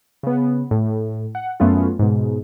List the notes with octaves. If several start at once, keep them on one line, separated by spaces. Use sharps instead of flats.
C#3 B3
A2
F#5
F#2 A3 B3 C#4 F4
G#2 B2